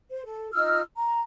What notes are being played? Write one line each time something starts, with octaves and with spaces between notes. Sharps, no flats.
C5
A4
D#4 F4 E6 F6
A#5